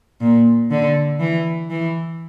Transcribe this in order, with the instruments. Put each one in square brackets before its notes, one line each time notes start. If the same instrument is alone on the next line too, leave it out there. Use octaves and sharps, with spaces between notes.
[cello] A#2
D3
E3
E3